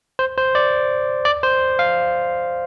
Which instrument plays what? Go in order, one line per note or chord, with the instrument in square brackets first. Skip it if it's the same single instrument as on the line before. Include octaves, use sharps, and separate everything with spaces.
[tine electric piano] C5
C5
D5
D5
C5
F5